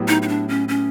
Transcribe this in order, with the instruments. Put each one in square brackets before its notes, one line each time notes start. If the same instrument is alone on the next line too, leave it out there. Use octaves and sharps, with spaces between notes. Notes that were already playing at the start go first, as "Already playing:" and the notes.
Already playing: [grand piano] A2 F#3 B3 E4 G4
[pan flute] D#4
D#4
D4
C#4
C#4